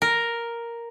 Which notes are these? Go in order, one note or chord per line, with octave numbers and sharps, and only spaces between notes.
A#4